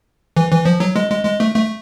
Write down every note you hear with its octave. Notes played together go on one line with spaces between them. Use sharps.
E3
E3
F3
F#3
G#3
G#3
G#3
A3
A3